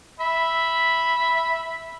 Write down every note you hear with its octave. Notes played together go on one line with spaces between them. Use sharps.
E5 B5